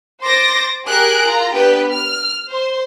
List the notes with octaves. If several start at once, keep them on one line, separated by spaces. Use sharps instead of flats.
C5 C6 D6 A6 A#6
G4 G#4 A#4 G#5 F#6 D7
F4 A#5
B3 D4 G4 B4 G5
F6
C5 C6